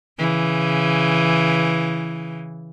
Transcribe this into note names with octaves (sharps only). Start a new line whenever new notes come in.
C#3 E3